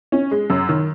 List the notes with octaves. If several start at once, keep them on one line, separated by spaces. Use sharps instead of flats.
C#4
G#3
F#2
D#3